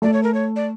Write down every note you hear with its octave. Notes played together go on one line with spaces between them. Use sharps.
A3 D5
C#5
A#4
C#5
D5